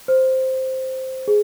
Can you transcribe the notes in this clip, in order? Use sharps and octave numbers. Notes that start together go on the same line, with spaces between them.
C5
G#4